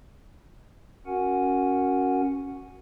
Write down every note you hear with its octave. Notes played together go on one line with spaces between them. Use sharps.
C#4 F#4 A#4 F#5 G#5